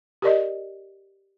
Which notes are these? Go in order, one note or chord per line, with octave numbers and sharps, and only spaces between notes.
G4 A#4 D5 D#5